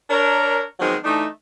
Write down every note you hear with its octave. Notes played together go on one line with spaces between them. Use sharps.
D4 A#4 C#5
D#3 F3 F#3 G#3 B3 C4
E3 A3 D4 D#4